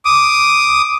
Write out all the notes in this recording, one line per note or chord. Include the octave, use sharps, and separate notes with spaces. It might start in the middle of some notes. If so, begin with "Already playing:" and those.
D6 D#6